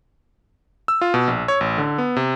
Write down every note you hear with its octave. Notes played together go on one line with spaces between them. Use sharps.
E6
F4
B2
A#1
C#5
A1
D3
B3
C3